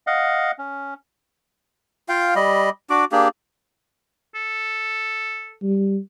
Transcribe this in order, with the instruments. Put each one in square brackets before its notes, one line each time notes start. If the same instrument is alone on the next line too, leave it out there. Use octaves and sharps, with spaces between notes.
[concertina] D#5 F5 F#5
C#4
[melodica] F4 F5 G5
G3 D#5 B5
D4 F#4 D6
A#3 D4 G4 G#4
[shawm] A4
[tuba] G3